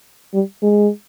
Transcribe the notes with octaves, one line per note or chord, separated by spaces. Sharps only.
G3
G#3